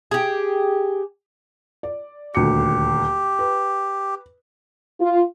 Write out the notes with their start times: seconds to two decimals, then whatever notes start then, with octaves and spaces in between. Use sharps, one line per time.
0.11 G4 G#4
1.83 D5
2.35 D#1 D2 G4 C#7
3.39 B4
5.01 F4